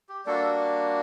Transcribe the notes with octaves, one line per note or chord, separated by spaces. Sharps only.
G4
G3 A#3 D4 F#4 A4